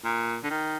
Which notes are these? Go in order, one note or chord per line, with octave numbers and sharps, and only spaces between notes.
A#2
D3
D#3